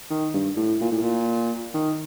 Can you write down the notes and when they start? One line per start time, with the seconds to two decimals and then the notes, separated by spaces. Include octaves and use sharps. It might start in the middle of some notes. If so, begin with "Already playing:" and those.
0.10 D#3
0.34 G2
0.57 A2
0.81 A#2
0.91 A2
1.02 A#2
1.74 D#3